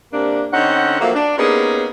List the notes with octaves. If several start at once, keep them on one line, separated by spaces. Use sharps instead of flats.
C3 A#3 D4
D3 C4 C#4 D#4 F#5
F3 F#3 A3 A#3
D4
A#3 B3 C#4 D#4 G4 G#4